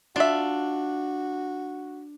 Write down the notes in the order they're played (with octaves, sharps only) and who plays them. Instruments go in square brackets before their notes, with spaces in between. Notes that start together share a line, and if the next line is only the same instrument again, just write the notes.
[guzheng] D4 [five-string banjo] F4 E5 [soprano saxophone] F#4